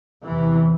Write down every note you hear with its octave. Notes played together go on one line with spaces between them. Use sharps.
E2 C3 E3